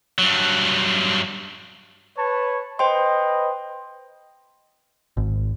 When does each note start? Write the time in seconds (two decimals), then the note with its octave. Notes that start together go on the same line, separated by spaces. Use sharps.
0.18 G2 F#3
2.17 B4 C#5 A5
2.79 B4 C5 D#5 G5 C6
5.17 G#1